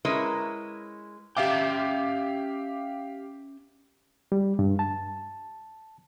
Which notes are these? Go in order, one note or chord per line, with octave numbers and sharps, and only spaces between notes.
G#3 C#4 E4 A#4 B4
C#4 G4 E5 F5 G5 D6
G3
G2
A5